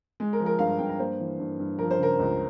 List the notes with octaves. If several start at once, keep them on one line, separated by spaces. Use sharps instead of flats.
G#3
A#4
F3
A#4
G2 F5
G2 G5
A#5
A#3 C5
E3
G2
G2
F3 A#4
C5
C#3 A#4
C#2